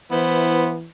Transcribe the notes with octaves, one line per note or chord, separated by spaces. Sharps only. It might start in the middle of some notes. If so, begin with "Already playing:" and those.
E3 B3 E4 C5